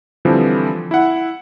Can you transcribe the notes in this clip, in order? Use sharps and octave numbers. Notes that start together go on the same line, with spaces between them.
D3 E3 F3 G3 C4
E4 F#5